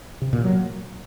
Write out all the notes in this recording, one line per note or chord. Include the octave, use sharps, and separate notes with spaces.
C3
A#2
F#3